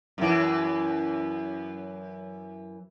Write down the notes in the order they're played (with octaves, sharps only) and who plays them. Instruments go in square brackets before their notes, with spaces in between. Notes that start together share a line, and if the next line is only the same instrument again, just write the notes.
[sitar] F#2 E3